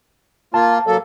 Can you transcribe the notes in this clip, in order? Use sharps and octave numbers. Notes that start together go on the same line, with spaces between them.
A#3 F4 A5
F#3 A#3 A4